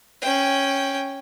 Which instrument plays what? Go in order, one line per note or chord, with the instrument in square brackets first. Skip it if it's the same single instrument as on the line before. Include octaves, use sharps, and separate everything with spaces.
[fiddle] C#4 G5